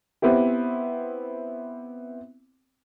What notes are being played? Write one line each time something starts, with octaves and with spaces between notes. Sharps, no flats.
B3 C4 E4 G4